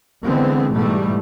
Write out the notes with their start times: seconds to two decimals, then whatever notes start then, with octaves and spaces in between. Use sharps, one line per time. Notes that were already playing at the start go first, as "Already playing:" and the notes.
0.23 D3 E3 G#3 B3 C4
0.73 G#2 B2 E3 G3 A3